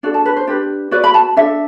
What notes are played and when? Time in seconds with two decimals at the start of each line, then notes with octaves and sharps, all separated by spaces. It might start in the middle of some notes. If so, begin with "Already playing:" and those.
0.03 D4 F#4 A4 D5
0.14 A5
0.25 B4
0.37 C5
0.47 D4 G4 B4
0.91 F#4 B4 D5
1.04 B5
1.14 A5
1.37 D4 A4 E5